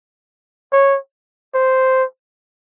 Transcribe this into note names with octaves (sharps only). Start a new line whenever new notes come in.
C#5
C5